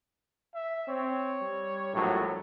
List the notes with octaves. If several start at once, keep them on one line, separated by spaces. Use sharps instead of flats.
E5
C4 C#5
G3
A#1 A2 F#3